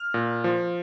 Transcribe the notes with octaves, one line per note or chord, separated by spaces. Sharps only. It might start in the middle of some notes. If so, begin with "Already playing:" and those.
Already playing: F6
A#2
F3